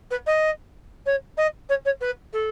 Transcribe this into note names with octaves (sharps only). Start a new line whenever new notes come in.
B4
D#5
C#5
D#5
C#5
C#5
B4
A4